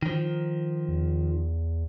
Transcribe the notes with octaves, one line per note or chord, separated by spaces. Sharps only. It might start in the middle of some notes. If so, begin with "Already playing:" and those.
D#3 F3
E2